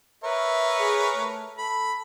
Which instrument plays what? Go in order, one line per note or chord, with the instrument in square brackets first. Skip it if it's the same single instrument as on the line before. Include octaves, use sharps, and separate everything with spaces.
[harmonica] A#4 B4 C#5 [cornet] E5
[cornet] G#4
A3
[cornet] A4 [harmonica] B5